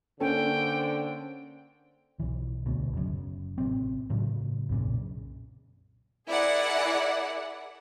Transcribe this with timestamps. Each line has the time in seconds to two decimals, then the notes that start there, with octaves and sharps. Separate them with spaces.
0.20 D3 A#3 C#4 A4 C5 G5
2.20 B1 E3
2.66 D2 B2
2.93 F#1 F#2
3.58 A1 C3 C4
4.10 A2 C#3 F#3
4.69 B1 F#2 A#2 C#3
6.27 E4 G#4 A#4 D5 F#5